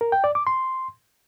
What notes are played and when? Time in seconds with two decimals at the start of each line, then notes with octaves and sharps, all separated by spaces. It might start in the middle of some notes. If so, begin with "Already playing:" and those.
0.01 A#4
0.12 G5
0.24 D5
0.35 D6
0.47 C6